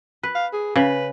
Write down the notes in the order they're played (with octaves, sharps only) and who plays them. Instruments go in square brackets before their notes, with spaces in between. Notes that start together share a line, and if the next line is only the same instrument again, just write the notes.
[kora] B4
[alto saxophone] F5
G#4
[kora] C#3 [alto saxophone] B4